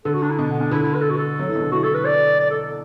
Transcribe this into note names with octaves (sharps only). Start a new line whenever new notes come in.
D3 A4
F#4
D4
E4
B2 D4
B3
D4
D3 E4
E4
B4
A4
F#4
A4
F#3
E3
B2
D3
E3 F#4
A4
B4
D5
D5
A4